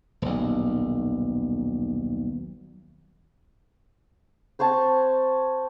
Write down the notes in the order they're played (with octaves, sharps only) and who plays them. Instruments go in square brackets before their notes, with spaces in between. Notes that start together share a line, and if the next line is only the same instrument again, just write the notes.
[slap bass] D#1 B1
[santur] C4 C5 C#5 A5